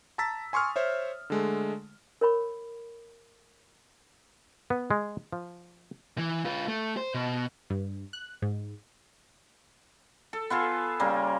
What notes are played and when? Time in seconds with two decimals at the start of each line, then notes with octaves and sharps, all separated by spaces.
0.18 A5 A#5 E6 A6 B6
0.53 G#5 C6 C#6 D#6 F6
0.76 C5 C#5 E5
1.30 D3 G#3 A3
2.21 A#4 C#5 B5 C#6
4.70 B3
4.91 G#3
5.32 F3
6.18 E3
6.45 F4 B4
6.68 A3
6.97 C5
7.14 B2
7.70 G2
8.13 F#6
8.42 G#2
10.33 A4
10.50 B3 F4 G#4 A4
11.00 C#3 G3 A#3